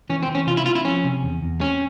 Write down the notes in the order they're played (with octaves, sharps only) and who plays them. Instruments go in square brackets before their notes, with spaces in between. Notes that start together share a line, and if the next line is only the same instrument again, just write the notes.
[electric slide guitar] E3 [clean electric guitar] C#4
[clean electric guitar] C4
[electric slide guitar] E3
[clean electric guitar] C#4
[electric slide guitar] C3 [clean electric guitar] F4
[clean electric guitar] E4
[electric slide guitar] C4 [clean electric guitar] F4
[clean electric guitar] E4
[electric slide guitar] F3 [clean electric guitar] C#4
[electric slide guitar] C3
E2
E2
[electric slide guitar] C4 [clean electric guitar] C#4